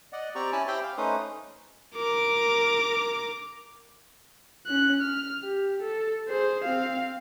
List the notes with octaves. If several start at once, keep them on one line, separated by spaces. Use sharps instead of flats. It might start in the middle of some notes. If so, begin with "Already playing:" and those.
D5 D#5 F#5
C4 G4 D5 A#5 C#6
C#4 E4 G#5 A5 B5
G4 C5 E5 G5 B5 C6
F5
A3 C#4 D#4 B4 C5 D#6
A#4 D6
C#4 F#6
F6
G4
A4
G#4 C5
C4 F5